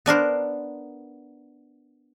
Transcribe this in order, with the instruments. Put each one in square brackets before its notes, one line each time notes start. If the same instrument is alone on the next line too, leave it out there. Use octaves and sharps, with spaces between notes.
[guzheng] B3 D4 A#4 C5